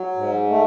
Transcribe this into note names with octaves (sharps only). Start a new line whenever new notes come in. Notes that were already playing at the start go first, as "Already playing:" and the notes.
Already playing: F#3
G#2
A3